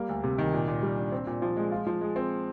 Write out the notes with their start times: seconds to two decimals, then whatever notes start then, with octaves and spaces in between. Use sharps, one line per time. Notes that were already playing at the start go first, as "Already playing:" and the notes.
Already playing: G3 A#3
0.09 D2
0.24 C3
0.38 D#3
0.54 A#2
0.68 A#2
0.83 G3
0.97 D4
1.12 C4
1.27 A#2
1.42 F3
1.57 G#3
1.72 F4
1.87 F3
2.01 G#3
2.16 C4